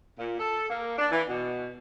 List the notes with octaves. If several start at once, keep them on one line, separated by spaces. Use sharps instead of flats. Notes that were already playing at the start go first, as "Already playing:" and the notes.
A#2
A4
A#3
D4
E3
B2